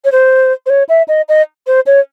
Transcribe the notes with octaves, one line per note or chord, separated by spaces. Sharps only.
C#5
C5
C5
C#5
E5
D#5
D#5
C5
C#5